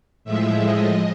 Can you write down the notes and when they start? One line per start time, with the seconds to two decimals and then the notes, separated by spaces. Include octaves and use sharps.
0.24 A2 F3 G#3 E5
0.65 D#5